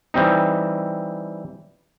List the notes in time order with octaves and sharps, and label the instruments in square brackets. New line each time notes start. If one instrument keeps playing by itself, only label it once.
[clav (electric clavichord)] E3 G3 C4 D#4